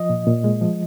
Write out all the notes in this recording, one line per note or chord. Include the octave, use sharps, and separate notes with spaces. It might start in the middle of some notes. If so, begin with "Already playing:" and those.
Already playing: F3 D#5
A#2
A#2
G#3
F3